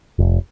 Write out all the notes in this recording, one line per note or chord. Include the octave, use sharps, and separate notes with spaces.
F1